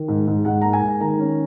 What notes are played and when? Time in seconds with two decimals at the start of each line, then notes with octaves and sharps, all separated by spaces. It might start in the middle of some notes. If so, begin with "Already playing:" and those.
Already playing: D#3
0.08 G#2
0.27 G#2
0.45 G#2 F#5
0.61 A#3 A#5
0.73 G#5
0.82 G#2
1.00 D#3 A#5
1.19 C#4